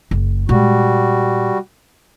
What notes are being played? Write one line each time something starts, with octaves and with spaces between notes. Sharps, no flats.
F#1
A#2 G3 G#3 F#4